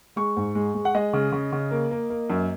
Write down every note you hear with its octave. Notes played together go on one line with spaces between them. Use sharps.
G#3 C#6
G#2
G#3
G#3
F#5
G#3 D#5
C#3
C#3
C#3
A#3
A#3
A#3
F#2